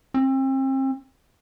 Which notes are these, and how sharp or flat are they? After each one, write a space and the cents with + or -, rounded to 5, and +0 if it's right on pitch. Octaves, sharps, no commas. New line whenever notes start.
C4 +35